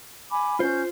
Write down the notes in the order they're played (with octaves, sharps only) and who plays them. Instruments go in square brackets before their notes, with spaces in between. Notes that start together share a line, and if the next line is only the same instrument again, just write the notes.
[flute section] G#5 B5 D6
[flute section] C#4 G6 [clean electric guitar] F4 C5